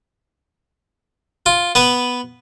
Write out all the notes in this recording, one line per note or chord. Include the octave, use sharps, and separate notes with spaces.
F4
B3 B4